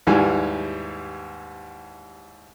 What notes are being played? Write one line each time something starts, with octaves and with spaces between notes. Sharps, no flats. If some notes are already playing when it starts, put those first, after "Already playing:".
D#2 G#2 E3 G3 G#5